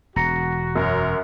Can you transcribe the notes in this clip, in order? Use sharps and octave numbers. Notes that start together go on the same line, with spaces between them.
E1 F#4 A#5 A#6 C#7
F#2 A#4 C#5 F#5